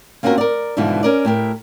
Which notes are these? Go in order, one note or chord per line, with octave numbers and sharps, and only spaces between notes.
A#3 C4 C#4 F4 F#4 A#4
A#4 D5
G#2 B2 D3 E3 F3 G3
C#4 A#4 D5
A2 G4 A#4